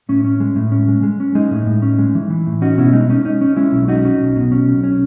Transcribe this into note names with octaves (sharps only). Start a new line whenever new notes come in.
A2 C#4
C#4
G#3
A2
C#4
G#3
G#3
C#4
G#3 D#4
A2
A2
C#4
G#3
E3
E3
A2
C#4 D#4 F#4
B2 C#4 E4
G#3 D#4
C#4 D#4
C#4 D#4
C#4
G#3 C#4 E4
B1
C#4 D#4 F#4
C#4
B1
B2
C#4
B1
C#4